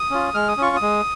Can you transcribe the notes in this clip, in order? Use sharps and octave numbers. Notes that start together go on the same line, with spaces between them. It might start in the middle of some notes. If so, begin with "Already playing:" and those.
Already playing: D#6
C#4 F4
G#3 F6
D#6
C#4 F4 C#6
D#6
G#3